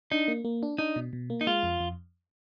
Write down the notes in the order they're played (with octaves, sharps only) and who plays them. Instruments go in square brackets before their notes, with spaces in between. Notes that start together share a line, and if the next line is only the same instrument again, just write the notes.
[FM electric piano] D4 [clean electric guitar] D#4
[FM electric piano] A#3
A#3
D4
[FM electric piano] D4 [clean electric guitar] D#4
[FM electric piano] B2
B2
A#3
[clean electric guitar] D#4
[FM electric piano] G#3 [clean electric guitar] F4
[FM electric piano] F2
F2